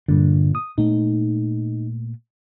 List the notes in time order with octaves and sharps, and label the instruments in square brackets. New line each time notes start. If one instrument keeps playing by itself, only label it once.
[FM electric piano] G2 D3 [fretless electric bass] A#2
[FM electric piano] D#6
[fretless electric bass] A#2 A3 B3 [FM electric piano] D#4